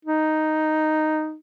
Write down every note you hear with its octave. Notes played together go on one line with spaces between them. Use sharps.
D#4